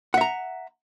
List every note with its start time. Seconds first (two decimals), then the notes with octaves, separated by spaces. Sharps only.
0.14 F#5
0.17 E5
0.21 A#5